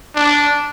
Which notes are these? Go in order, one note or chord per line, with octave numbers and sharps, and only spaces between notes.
D4